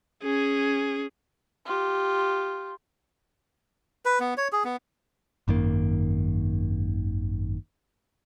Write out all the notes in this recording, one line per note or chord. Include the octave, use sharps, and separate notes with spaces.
C#4 G#4
F4 G4
B4
B3
C#5
G#4
B3
G#1 F#2 D#3 A#3